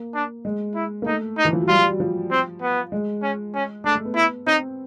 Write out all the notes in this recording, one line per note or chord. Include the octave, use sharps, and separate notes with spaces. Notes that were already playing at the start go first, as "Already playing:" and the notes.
Already playing: A#3
D4
G#3
E4
A#3
A3 D#4
D#4
E3
F3
F#3
G3 F4
G3
F#3
F3
C4
B3
G#3
C#4
C#4
A3 D4
A3
B3
E4
C4 D#4